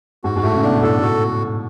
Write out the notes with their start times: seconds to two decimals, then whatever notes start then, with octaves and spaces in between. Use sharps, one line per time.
0.24 G#2 F#4
0.36 G#2
0.43 A2 A3
0.54 C#3
0.63 B2 D4
0.82 A2 A4
0.97 G#2 F#4